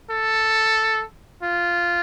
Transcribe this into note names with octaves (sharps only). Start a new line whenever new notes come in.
A4
F4